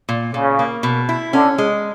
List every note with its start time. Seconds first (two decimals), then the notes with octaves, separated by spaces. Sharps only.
0.09 A#2
0.34 A#2 C#3
0.59 A#3
0.83 B2
1.09 E4
1.33 D3 C#4
1.58 G#3